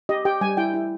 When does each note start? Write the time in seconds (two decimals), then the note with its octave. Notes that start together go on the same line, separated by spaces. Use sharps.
0.09 G4 D#5
0.25 G4 G5
0.41 G3 G#5
0.57 E4 G5
0.74 E4